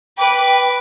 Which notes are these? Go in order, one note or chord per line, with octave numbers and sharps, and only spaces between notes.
B4 G5 D6